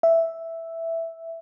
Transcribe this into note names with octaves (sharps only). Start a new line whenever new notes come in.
E5